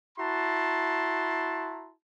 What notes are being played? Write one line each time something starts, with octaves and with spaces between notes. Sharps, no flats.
E4 F#4 A5 A#5 C6